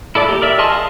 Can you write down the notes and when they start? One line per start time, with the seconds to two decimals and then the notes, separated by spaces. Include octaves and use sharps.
0.15 E4 A4 D5 D6
0.29 A#3 G4
0.42 A#4 D5 E5 E6
0.58 G#4 A#4 D#5 A5 C6
0.72 F5 A5 D#6